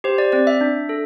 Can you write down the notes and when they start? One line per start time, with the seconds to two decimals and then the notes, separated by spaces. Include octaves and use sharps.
0.04 G4 C5
0.18 D5
0.32 C4 D5
0.47 E5
0.61 D4
0.89 A4